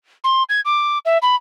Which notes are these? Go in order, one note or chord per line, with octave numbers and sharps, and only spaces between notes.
C6
G#6
D6
E5
B5